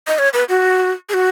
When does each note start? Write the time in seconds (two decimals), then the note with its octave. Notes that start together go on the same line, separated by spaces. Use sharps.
0.08 D#5
0.19 C#5
0.34 B4
0.49 F#4
1.09 G#4
1.14 F#4